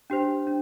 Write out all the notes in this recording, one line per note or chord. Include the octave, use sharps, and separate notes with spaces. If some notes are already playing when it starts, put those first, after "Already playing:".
D4 G4 C5
D4